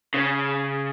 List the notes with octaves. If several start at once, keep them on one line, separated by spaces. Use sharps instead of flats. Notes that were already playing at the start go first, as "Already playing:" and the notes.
C#3